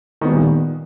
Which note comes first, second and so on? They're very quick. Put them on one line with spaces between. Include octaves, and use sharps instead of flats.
D#3 B3 G3 A#2